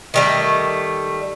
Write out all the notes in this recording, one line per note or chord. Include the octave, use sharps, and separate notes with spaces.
D#3 G3 A3